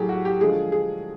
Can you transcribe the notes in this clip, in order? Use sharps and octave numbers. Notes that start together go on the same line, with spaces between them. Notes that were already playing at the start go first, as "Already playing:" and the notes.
Already playing: A2 F#3 G4 G#4
F#4
G4
D3 F3 G#3 G#4
G#4